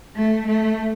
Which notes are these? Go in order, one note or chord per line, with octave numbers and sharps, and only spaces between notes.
A3
A3